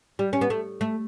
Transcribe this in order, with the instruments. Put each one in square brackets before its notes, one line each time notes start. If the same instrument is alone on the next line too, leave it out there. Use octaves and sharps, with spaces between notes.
[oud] G3
C#4
B3
A3
A3